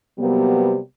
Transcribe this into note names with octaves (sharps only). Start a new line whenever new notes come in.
C3 F#3 G3 A#3 B3